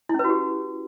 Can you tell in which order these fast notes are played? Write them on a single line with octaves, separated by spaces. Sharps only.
E4 C#4 B4 F#4 G4